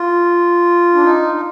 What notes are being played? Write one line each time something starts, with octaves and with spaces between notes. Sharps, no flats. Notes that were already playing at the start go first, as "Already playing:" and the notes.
Already playing: F4
D4
D#4
D#4